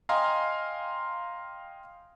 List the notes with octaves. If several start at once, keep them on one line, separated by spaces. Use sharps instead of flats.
D#5 F5 G5 G#5 A#5 C6